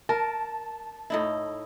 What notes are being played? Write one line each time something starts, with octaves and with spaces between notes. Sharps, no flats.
A#4 A5
A2 D#4 E4